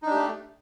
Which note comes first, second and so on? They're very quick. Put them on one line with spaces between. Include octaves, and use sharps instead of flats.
D#4 D4 G4 A3